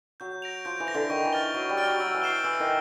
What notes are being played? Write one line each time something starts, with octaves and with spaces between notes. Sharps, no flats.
F#3 G6
A#6 D7 F7
F3 G6
E3
A#6 D7 F7
D3
D#3 C#6
E3
F6 A6 D7 G7
F#3 C#6
G3
F6 A6 D7 G7
F#3
F#3 E6
E3
G6 C7 E7 G7
E3 E6
D#3